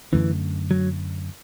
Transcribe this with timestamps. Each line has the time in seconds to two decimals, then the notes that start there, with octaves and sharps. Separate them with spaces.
0.12 F#2 D3 E3 A3 C#4
0.71 F#3